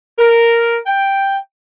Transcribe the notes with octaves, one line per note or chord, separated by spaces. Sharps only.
A#4
G5